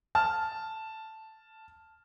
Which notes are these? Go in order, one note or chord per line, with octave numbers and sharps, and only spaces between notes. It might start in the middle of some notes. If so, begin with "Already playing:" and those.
A5 F6